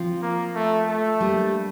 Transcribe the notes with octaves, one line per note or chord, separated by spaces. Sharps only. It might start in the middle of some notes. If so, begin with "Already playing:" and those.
Already playing: F3 C4 F4
A#3
A3
A3
G3 A#3 D4 G4